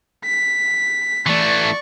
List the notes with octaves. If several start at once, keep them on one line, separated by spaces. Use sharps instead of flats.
B6
E3 A3 D5 C#6